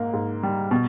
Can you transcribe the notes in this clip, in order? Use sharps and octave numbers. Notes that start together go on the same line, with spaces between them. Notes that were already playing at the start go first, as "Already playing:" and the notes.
Already playing: G#2 A#3
G#2
G3
B2